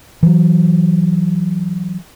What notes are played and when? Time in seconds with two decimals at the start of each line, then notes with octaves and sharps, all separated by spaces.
0.23 E3 F#3